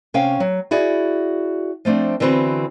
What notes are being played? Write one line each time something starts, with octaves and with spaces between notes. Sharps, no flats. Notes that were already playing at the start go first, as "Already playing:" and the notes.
C3 C#4 F5 G5
F#3
E4 F#4 G#4 D5
F3 A3 C4 D4
D3 E3 B3 C4 F#4 B4